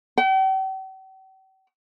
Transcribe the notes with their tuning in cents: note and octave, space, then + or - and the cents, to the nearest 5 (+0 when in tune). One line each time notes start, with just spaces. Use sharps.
G5 -45